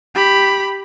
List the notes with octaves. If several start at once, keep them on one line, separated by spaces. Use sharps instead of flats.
G4 B5